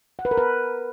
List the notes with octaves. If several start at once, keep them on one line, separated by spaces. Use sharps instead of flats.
F#5
B4
A#4
B4